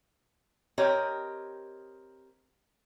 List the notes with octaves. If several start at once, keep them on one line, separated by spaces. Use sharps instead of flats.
C4 G4 A#4 C#5 D#5